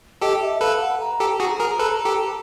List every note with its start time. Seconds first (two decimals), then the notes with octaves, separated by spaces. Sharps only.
0.22 G4 A4 D#5
0.41 E5
0.61 A4 B4 F5
0.81 F#5
1.00 A#5
1.20 G4 A4
1.40 F#4 G#4
1.60 G#4 A#4
1.79 A4 B4
2.05 G4 A4